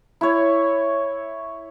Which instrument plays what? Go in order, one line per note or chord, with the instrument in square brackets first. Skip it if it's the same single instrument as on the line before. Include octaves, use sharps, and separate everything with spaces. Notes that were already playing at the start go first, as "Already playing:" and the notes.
[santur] E4 C#5